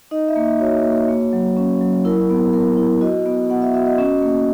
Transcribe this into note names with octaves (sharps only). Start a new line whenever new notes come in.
D#4 D#5
E5
A#3
E5
F#4 C#5
A#3
A#3
F#3
C#4
F#3
E4 A#4
B3
B3 A#4
E4
F#4 D#5
B3
B3 F#5
E5
F#4 E5
D#5
C#4
A#3